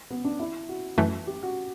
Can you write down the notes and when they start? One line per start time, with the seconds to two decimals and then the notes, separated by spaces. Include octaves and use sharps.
0.10 B3
0.25 D4
0.39 E4
0.69 F#4
0.98 F#2 E3 A3
1.27 G4
1.43 F#4